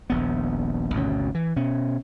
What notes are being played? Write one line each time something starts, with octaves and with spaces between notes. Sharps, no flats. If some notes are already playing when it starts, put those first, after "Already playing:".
D#1 A#1 B3
G#1 D2 B2 C#4
E3
B2 C#4